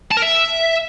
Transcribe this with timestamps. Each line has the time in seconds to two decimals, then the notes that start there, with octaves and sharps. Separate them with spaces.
0.11 A5
0.17 A#4
0.22 E5